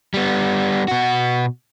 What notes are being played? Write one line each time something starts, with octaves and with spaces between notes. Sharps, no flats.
G3 B3
B2 F#4